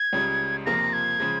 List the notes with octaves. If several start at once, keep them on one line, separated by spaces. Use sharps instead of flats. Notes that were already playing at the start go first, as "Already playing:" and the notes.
Already playing: G#6
C#2 C#3 G3
F2 C3 F3 A#3 F4 A#6
G#6
C#3 F3 G#3